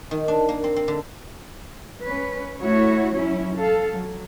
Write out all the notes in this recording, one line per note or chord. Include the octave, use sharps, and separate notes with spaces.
D#3
D4
A#3
C4
C4
D3
C#4 B4
A3 E4 F#4 C#5
F#3 C#4 E4
A4 F5
F#3